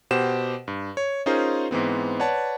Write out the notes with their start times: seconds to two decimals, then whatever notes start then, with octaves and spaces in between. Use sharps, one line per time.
0.11 B2 G4 C5 F#5 E7
0.68 G2
0.97 C#5
1.26 C#4 D#4 F4 G#4 A#4 C5
1.71 G#2 E3 B3 C4
2.19 B4 C#5 D5 F#5 A5